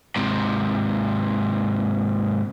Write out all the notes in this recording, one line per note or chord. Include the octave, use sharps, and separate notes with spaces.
G#2 C3